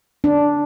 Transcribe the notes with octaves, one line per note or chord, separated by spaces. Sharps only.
D4